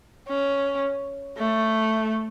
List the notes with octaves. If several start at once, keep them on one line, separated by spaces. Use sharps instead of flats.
C#4
A3